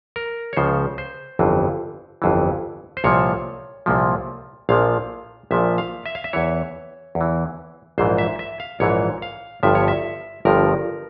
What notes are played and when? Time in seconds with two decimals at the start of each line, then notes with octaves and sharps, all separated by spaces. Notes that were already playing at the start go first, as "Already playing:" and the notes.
0.16 A#4
0.53 C#5
0.57 C#2 C#3 F3 C5
0.98 C5
1.39 G1 F2 E3
2.22 G1 F2 E3
2.97 C5
3.04 C2 A#2 F3 C#5
3.86 C2 A#2 F3
4.69 A#1 A#2 F3 F5
5.51 A#1 A#2 F3 E5
5.78 F5
6.06 E5
6.15 F5
6.24 E5
6.33 E2 E3 C#5
7.15 E2
7.21 E3
7.98 A#1 G#2 E3 C5
8.18 E5
8.39 E5
8.60 F5
8.80 A#1 G#2 E3 C#5
9.22 F5
9.63 G1 G2 F3 E5
9.75 C#5
9.88 E5
10.45 G1 G2 F3 A#4